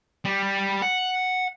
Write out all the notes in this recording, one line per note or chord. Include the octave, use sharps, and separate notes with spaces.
G3
F#5